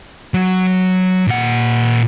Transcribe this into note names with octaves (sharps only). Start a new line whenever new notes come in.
F#3
A#2 F#5